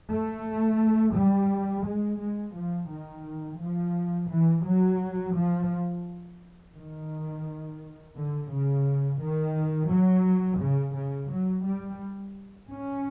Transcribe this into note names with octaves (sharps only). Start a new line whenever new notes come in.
A3
G3
G#3
G#3
F3
D#3
F3
E3
F#3
F3
D#3
D3
C#3
D#3
F#3
C#3
C#3
F#3
G3
C#4